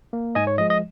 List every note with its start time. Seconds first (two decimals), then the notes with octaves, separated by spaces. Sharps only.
0.13 A#3
0.35 G#2 D#5 G#5
0.47 C#5
0.58 F3 G#3 D#5
0.70 D#5